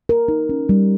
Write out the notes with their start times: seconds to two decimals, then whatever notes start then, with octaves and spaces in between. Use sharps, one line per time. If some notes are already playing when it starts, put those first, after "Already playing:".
0.09 A#4
0.28 D#4
0.49 C#4
0.69 G3